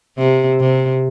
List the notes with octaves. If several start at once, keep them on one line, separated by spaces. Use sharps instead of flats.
C3
C3